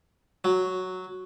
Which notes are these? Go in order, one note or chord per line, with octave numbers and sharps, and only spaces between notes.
F#3